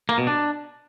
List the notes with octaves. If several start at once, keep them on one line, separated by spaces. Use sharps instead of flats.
A#3
B2
D4